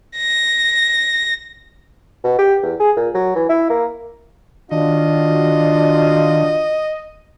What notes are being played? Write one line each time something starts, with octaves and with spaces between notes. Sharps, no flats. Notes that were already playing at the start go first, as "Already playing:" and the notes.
A#6
B2
G4
E2
G#4
A#2
F#3
E3
E4
A#3
D#3 D4 F4 F#4 D#5